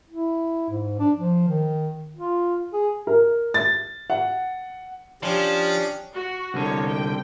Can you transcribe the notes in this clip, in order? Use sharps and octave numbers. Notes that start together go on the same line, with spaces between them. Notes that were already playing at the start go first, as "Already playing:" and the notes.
E4
G#2
D4
F3
D#3
F4
G#4
A#4
A6
F#5
F3 C#4 D4 G4
F#4
C2 D3 D#4 C#5
G5